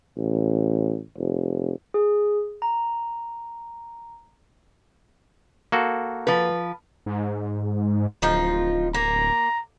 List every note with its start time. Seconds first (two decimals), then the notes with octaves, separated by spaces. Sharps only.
0.17 A1
1.18 F1
1.94 G#4
2.62 A#5
5.72 A#3 F#4 A4
6.27 F3 B4
7.06 G#2
8.22 D1 F3 D#4 F4
8.94 A#3 A#5